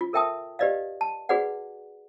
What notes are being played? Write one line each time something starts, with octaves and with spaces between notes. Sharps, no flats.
F4
A4 A#4 E5 G5 A5 D#6
G4 B4 D5 D#5 F5
A5
F#4 G#4 B4 D5 F#5